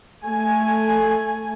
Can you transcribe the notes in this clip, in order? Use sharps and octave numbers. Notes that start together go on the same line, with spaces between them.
A3 G#5